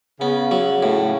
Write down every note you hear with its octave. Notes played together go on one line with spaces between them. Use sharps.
C#3 B3
F#3
A2